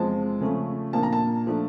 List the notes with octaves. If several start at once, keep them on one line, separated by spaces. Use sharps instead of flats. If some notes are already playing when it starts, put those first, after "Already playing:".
Already playing: E2 C3 F3 G#3 C4 A5
C#3 F3 A3 C#4
A#2 F3 A#3 D4 A5
A#5
A5
F3 A3 D4